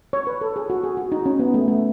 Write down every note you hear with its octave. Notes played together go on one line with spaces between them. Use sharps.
C#5
B4
A4
G#4
F#4
G#4
F#4
D#4
C#4
B3
A3
A3